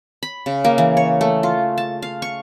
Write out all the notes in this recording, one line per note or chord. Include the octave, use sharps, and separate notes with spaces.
B5
C#3
A#3
E3
C#5
A3
F4
A5
F5
C#6